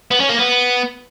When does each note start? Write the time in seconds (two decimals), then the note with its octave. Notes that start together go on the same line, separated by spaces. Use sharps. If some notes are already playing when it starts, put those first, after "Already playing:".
0.11 B3
0.20 C#4
0.29 A#3
0.38 B3